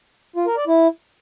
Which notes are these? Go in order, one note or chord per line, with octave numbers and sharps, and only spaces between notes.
F4
A#4
D5
E4